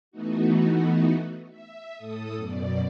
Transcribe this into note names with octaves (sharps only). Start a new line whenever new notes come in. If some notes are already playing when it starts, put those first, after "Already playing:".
E3 A3 B3 D#4 F#4
E5
A2 A4 D#6
F#2 B2 D5